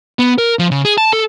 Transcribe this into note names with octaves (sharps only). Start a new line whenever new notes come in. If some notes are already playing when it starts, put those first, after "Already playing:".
B3
A#4
F3
C#3
G#4
A5
A4